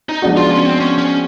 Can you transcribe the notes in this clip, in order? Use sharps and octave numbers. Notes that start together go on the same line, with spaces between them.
D#4
F3 G#3 B3 D4 F#4
F4
C#4
C4
C#4
C#4